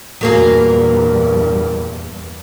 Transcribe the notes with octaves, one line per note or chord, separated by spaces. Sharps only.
E2 G2 A#2 F#3 A#3 G#4